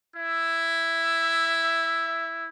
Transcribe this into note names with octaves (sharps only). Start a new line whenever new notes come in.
E4 E5